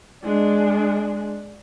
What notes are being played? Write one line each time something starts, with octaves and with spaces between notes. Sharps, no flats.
G#3 D4